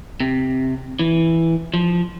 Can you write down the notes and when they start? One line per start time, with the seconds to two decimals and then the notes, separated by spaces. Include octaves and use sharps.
0.20 C3
0.99 E3
1.74 F3